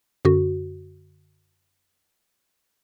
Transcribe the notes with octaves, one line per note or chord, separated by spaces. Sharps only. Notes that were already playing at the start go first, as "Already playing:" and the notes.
F#2 D3 F#4